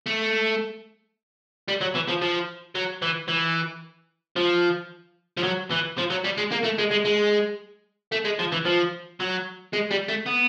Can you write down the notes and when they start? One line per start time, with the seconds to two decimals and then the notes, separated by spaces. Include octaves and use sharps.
0.06 A3
1.68 G3
1.81 F#3
1.95 E3
2.08 F3
2.22 F3
2.75 F#3
3.02 E3
3.28 E3
4.36 F3
5.37 F3
5.43 F#3
5.71 E3
5.98 F3
6.10 F#3
6.24 G3
6.37 G#3
6.52 A#3
6.64 A3
6.78 G#3
6.91 G#3
7.05 G#3
8.12 A3
8.25 G#3
8.39 F3
8.52 E3
8.65 F3
9.20 F#3
9.73 G#3
9.91 G3
10.08 A3
10.26 B3